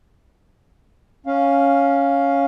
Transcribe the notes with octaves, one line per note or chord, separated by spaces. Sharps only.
C#4 F5